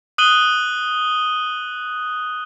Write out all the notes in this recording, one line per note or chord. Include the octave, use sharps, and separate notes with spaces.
D#6 F#6 D#7 F#7 G7